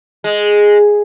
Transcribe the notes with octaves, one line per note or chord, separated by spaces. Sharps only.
G#3